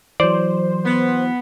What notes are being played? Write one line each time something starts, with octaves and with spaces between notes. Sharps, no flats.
E3 F#3 C5 D5
B3